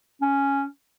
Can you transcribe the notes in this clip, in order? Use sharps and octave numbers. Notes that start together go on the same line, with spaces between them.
C#4